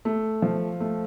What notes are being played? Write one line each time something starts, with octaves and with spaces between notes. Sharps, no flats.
A3
F3
A3